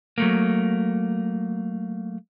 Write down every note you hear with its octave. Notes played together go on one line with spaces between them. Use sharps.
F#3 A3 A#3